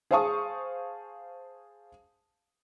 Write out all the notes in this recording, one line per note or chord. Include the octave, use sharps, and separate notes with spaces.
G#4 C5 F5 A5 C#6 D#6